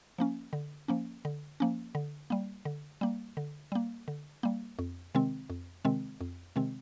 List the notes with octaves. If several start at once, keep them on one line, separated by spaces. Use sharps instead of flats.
F3 A#3 C#4
D3
F3 A#3 C#4
D3
F3 A#3 C#4
D3
G3 A#3
D3
G3 A#3
D3
G3 A#3
D3
G3 A#3
F2
C3 D#3 G#3 C4
F2
C3 D#3 G#3 C4
F2
C3 D#3 G#3 C4